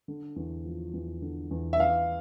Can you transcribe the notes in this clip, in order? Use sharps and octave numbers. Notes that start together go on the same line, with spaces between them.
D3
E2
F3
E2
D3
E2
E5
E3 F5